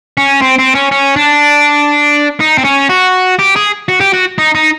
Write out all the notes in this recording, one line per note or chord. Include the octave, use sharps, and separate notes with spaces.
C#4
C4
C4
C#4
C#4
D4
D#4
C4
C#4
F#4
G4
G#4
F#4
G4
F#4
D#4
D#4